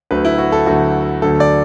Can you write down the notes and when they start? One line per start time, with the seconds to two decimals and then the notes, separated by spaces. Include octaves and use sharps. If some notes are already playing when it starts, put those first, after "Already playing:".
0.11 D2 D3 F#3 A3 B4
0.25 E4
0.38 F#4
0.52 A4
0.66 D2 D3 F#3 A3 F#4
1.22 D2 D3 F#3 A3 A4
1.40 D5